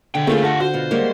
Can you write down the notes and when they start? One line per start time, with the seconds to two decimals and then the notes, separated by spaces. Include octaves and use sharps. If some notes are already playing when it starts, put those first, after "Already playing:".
0.15 B2 D3 G5
0.27 A3 A#3 C4 D#4 F4 G#4
0.44 F4 G4 F#5 A5
0.60 F#4 C5
0.74 B2 F4
0.91 G3 G#3 A#3 C#5